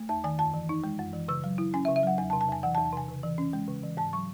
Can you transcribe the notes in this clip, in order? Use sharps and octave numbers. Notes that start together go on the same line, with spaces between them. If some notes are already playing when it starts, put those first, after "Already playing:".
Already playing: A3
E2 A5
D#3 G#5
F#2 A5
E3
D#4
G#3
F#2
E3
C#3 E6
F#3
E4
C#4 G#5
E5
C#3
E5
F#3 F#5
E2 G#5
A5
C3
A5
E2 G#5
E3 F#5
A5
E2
A5
C3 G#5
C#3
E3
C#4
G#3
C#3
E3
G#2 A5
F#3 C#6